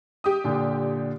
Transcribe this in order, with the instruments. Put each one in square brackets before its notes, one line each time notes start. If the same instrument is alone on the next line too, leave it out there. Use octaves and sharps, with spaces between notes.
[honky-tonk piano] G4 D#6
[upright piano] A#2 D3